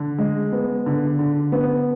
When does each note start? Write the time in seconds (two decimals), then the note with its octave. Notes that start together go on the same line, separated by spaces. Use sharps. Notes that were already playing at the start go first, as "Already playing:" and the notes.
Already playing: D3
0.18 G#3
0.52 B3
0.86 D3
1.19 D3
1.52 B3